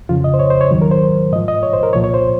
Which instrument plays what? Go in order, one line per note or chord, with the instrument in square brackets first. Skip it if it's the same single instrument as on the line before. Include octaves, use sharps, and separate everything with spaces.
[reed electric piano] F2 C#3 F3 F4
D#5
C5
C#5
C5
C#5
D#2 D#3 F#3
A#4
C5
G#2 D#5
F3
D#5
C#5
C5
A#4
C2 A#2 F3 C#5
C#5
C5